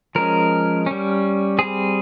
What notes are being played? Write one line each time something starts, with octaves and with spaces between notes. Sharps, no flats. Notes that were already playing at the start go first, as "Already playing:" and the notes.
F3 G#3 C#4 A#4
G3 C#4
G3 C4 G#4